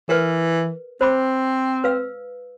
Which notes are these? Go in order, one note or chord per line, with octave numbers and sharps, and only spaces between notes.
E3 A#4 B4
C4 C5 B5 D6
B4 F5 E6